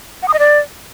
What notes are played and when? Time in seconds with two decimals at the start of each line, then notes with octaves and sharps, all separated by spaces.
0.23 F#5
0.28 D#6
0.34 D#5
0.39 D5